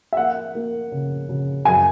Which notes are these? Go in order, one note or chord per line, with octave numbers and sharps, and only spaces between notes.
E5
A#3 F#5
A#3
C#3
C#3
F#2 G#5